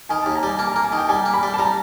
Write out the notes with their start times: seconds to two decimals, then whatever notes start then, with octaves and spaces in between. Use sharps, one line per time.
0.09 D#3 G#5
0.22 A5
0.26 D#2
0.35 A#5
0.43 G3 G#5
0.59 A#3 A5
0.72 A#5
0.76 A#3
0.84 G#5
0.92 D#3
0.97 G5
1.09 G3 G#5
1.26 A#3
1.34 B5
1.43 G3
1.54 A5
1.59 G3 A#5